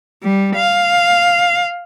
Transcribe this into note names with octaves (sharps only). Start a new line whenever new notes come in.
G3
F5